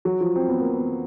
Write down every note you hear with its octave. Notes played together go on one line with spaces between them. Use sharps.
F#3
F3
C4
B3
A#3
B3